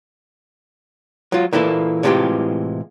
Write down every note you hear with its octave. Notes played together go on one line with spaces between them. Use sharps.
F#3 F4
A#2 E3 A#3 E4 A4
A2 C3 E3 G#3 F4 G4